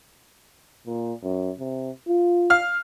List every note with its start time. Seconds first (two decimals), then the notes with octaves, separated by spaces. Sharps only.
0.87 A#2
1.23 F#2
1.60 C3
2.08 F4
2.50 F5 F6